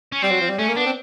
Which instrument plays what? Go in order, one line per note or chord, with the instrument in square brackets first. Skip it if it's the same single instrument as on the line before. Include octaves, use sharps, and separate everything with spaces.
[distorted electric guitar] C#4
[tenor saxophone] G3 [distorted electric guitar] C4
[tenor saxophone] F#3
F3
G3
[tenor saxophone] A3 [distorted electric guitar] C#4
[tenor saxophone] A#3
[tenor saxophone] B3 [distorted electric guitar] D4
[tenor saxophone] C4